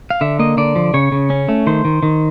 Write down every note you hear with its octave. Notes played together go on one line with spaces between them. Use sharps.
F5
D3 E5
A#3 D#5
D3 D5
F3
C#3 C#5
C#3
C#4
A3
D#3 C5
D#3
D#3